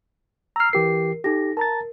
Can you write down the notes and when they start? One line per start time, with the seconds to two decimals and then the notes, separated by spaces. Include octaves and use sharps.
0.56 A#5 E6 F6 C7
0.73 E3 G4 A#4 C7
1.24 D#4 G4 A4 A#6
1.57 A#4 A5 A#5 A6